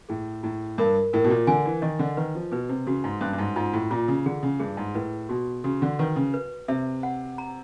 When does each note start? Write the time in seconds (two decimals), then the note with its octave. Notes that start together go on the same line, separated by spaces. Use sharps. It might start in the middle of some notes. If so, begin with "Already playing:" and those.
0.09 A2 G#4
0.43 A2 E4
0.78 G2 A#4
1.13 A2 A#4
1.24 B2
1.30 A#2
1.47 D3 G#5
1.66 E3
1.82 D#3 D#5
1.99 D3
2.17 D#3 B4
2.35 F3
2.52 B2 B4
2.69 C3
2.87 C#3 F#4
3.04 G#2
3.21 G2 C#4
3.33 G2
3.38 G#2
3.56 G#2 F4
3.73 A2
3.91 A#2 F4
4.08 C#3
4.26 D3 G#4
4.43 C#3
4.60 G2 G#4
4.77 G#2
4.95 A2 B4
5.29 B2 F#4
5.64 C#3 F#4
5.82 D3
5.99 D#3 B4
6.16 C#3
6.34 B4
6.68 C3 E5
7.03 F#5
7.38 A#5